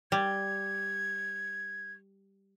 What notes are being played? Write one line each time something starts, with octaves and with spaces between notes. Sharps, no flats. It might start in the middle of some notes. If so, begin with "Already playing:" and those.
G3 G#6